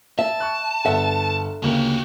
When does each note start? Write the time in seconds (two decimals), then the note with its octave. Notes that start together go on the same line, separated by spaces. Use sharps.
0.19 E5 A5
0.40 C#6 F#6
0.85 G1 A4 E5 F#5
1.63 D2 C#3 A#3 F#4 G4